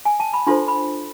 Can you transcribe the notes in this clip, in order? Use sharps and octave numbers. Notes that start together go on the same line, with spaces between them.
G#5
A5
B5
D4 F4 A4 C5 C6
B5